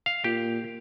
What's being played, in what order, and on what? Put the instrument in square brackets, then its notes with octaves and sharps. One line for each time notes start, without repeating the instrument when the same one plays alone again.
[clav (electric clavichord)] F5
[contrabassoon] A#2 [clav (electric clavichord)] G4